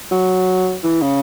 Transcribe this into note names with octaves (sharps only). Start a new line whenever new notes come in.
F#3
E3
C#3